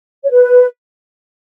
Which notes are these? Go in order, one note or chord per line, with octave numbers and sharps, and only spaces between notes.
C#5
B4